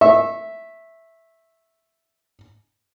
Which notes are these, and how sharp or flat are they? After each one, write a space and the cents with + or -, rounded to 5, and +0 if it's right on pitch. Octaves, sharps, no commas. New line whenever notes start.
E5 +0 C#6 -25